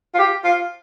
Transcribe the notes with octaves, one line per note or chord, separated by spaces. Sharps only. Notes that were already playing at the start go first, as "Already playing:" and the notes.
F4
G4
F4